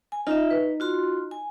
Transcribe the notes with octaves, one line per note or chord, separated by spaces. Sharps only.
G#5
D#4 F4 E5
B4
F4 F#4 C6
G#5